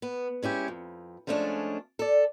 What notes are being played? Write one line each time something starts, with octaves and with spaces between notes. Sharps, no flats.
B3
G#3 C#4 E4 G4
F2
F3 G#3 A3 C#4 D4
A4 D5